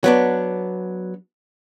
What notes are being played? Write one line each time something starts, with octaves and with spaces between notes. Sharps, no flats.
F#3 B3 D4